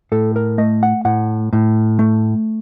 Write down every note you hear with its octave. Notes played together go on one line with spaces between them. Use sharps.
A2 A4
A#4
A3 D#5
F#5
A2 F#5
A2
A3